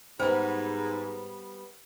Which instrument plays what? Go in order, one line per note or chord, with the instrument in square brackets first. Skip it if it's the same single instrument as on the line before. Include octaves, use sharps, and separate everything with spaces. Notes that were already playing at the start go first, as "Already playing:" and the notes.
[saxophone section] G#2 [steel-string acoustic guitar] G3 B3 [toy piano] C5